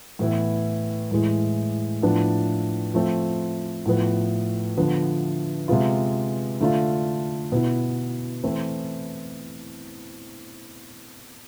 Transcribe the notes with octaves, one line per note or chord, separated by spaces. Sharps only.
A2 E3 B3 E4
A2 E3 G#3
A2 F3 B3 D4
F3 A3 C4
A2 F3 B3
D3 F3 B3
C3 G#3 B3 F4
D3 A3 D4 F4
B2 B3 E4
E3 A3 C4 E4